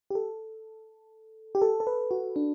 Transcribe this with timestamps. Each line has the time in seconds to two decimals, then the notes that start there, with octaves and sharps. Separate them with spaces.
0.10 G4
0.15 A4
1.55 G4
1.62 A4
1.80 A4
1.87 B4
2.11 F#4
2.36 D4